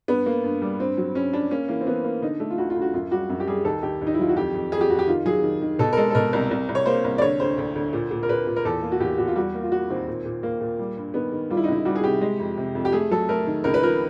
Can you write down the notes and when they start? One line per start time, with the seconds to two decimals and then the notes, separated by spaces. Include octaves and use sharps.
0.08 G2 B3
0.26 A#3
0.44 G2
0.62 G3
0.79 G2 C4
0.97 F#3
1.15 G2 C#4
1.33 G2 D4
1.51 A#3 C#4
1.69 E3 A#3
1.81 C4
1.86 E3 B3
2.04 A#3
2.22 D3 D#4
2.40 A3
2.50 F4
2.58 D2 F#4
2.70 F4
2.76 D2
2.82 F#4
2.94 F#2 F4
3.11 G3 F#4
3.30 F#2
3.40 G4
3.48 G3 G#4
3.65 D#2 A4
3.83 D#2 G4
4.01 D#2
4.07 D#4
4.14 E4
4.19 F#3 F4
4.29 F#4
4.36 F2 G4
4.54 F2
4.72 F2 G#4
4.81 G4
4.90 F2 F#4
4.99 G4
5.08 D#3 F4
5.26 F#3 G#4
5.43 D#3
5.62 D#3
5.79 B2 A4
5.93 A#4
5.97 G#3 A4
6.11 A4
6.15 B2 A#4
6.33 C2 A#4
6.51 C2
6.69 C2
6.75 C#5
6.86 A#3 C5
7.04 C2
7.18 D5
7.22 D3 C#5
7.40 D2 C5
7.58 D2
7.75 D2
7.93 A#2
8.11 A#2
8.23 A#4
8.29 A#2 B4
8.47 A#2
8.56 A#4
8.65 E2 A4
8.82 A#3
8.92 F#4
9.00 E2 G4
9.18 E2 F#4
9.27 F4
9.36 G3 F#4
9.54 A#3
9.63 F4
9.72 A#3 F#4
9.90 D#2 C4
10.08 A#2
10.25 A#2
10.43 A#2 A#3
10.61 A#2
10.79 G3
10.97 G2
11.14 D#3 B3
11.32 D#3
11.50 G3 F4
11.57 E4
11.64 D#4
11.68 C#2 E4
11.85 G3 F#4
11.96 G#4
12.04 C3 G4
12.21 G#3
12.39 F2
12.57 C3
12.75 F2
12.85 G4
12.92 A3 G#4
13.11 F#3 A4
13.29 A3 A#4
13.47 D#3
13.64 C#2 A#4
13.74 B4
13.82 F3 A#4